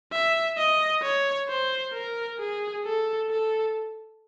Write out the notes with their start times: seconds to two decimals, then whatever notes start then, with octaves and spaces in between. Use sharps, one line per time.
0.12 E5
0.58 D#5
1.03 C#5
1.48 C5
1.94 A#4
2.39 G#4
2.85 A4
3.30 A4